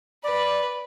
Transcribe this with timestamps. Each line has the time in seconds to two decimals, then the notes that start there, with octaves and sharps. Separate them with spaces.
0.24 B4 D5